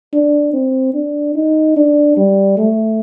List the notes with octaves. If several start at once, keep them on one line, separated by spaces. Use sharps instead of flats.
D4
C4
D4
D#4
D4
G3
A3